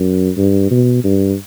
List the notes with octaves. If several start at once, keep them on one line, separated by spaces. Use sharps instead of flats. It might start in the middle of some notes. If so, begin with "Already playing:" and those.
Already playing: F#2
G2
B2
G2